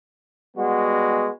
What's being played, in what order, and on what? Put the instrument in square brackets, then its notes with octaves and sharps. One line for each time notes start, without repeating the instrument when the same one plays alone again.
[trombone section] G3 G#3 B3 F#4